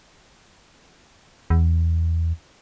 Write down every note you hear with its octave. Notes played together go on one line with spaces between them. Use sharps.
E2